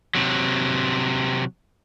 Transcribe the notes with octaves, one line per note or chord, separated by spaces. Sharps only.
C3 F#3